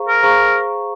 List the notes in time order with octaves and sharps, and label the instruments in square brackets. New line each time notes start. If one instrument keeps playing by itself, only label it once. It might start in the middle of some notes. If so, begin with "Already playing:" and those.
Already playing: [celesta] G#4 C5 F5 A#5 C#6
[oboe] A#4
[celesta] G#4 C5 F5 A#5 C#6